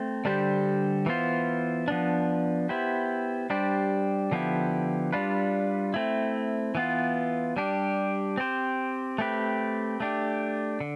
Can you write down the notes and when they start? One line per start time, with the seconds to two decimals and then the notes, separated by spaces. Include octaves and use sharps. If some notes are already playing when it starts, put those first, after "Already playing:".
Already playing: A3 C4
0.25 D3 G3 D4 G4 C5
1.06 E3 B3 F4 C5
1.88 F3 B3 D4
2.69 B3 E4 G4 C5
3.50 G3 D4 G4 C5
4.31 D3 F3 B3 E4 G4
5.13 G3 D4 F4 B4
5.94 A3 C4 E4
6.75 E3 B3 F4
7.56 G3 D4 G4
8.38 C4 G4 C5
9.18 A3 C4 G4 B4
10.00 A3 D4 G4
10.80 D3